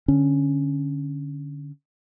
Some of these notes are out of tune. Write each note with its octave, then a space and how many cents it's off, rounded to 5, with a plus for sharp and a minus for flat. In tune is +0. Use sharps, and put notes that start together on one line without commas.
D3 +0 C#4 +0